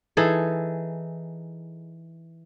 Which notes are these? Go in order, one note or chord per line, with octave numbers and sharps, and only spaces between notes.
E3 D#4 G#4 A4